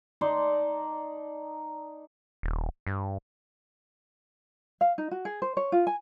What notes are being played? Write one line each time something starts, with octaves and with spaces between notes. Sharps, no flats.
D#4 D5 A5 C6
D#1
G2
F5
D#4
F#4
G#4
C5
C#5
F4
G#5